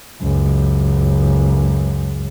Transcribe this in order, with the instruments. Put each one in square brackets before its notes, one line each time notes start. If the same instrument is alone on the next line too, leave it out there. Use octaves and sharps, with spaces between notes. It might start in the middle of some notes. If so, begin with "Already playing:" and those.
[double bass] C#2 F#2